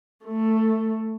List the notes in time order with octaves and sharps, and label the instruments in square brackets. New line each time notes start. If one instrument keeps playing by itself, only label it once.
[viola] A3